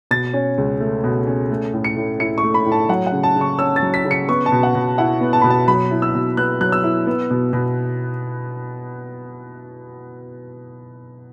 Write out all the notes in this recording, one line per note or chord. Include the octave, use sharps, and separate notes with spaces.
B2 A6
C#4
C#2
A3
B2
C#4
A3
A2
C#7
A2
E4 C#7
C#6
A3
B5
A2
A5
F#3 F#5
F#5
C#3
A5
C#3
C#6
C#4 E6
A6
F#3
B6
C#3
C#7
B3 C#6
A5
B2
F#5
B2
E4 F#5
B3
A5
B2 B5
A5
F#3 B5
E4
E6
B2
B3 F#6
F#3 F#6
E6
E4
B3
B2
B2